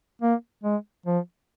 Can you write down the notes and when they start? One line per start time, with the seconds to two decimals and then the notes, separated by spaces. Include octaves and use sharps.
0.22 A#3
0.64 G#3
1.06 F3